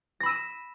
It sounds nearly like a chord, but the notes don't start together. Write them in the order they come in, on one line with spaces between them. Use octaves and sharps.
A#6 B5 E6 D#7